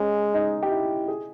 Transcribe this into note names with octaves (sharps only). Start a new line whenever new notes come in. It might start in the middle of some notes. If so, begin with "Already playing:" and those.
Already playing: G#3 C#4
D#4
G4
E4
G#4